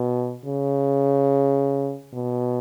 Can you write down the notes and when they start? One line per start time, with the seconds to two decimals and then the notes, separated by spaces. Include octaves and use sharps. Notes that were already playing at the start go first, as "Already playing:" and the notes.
Already playing: B2
0.45 C#3
2.13 B2